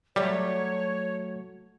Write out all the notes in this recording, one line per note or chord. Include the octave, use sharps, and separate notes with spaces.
F#3 G3 A3 C#5 E5